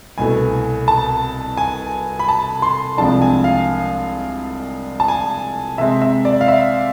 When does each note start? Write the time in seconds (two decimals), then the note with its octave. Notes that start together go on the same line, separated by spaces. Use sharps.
0.18 C2 B2 A3 G#5
0.88 A5
1.57 G#5
2.19 B5
2.29 A5
2.62 C6
2.98 C2 C3 F3 G#3 D4 A5
3.22 G#5
3.44 F5
5.00 A5
5.08 G#5
5.78 C3 G#3 C4 E5
6.02 E5
6.25 D5
6.41 F5
6.48 E5